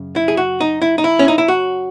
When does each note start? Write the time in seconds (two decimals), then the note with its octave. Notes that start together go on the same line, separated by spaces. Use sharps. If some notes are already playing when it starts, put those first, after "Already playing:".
Already playing: F#2 C#3
0.16 E4
0.28 G#4
0.37 F#4
0.61 D#4
0.82 E4
0.98 D#4
1.04 E4
1.19 C#4
1.28 D#4
1.38 E4
1.48 F#4